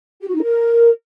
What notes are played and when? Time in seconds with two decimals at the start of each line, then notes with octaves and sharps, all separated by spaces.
0.21 G4
0.28 F#4
0.35 D#4
0.42 A#4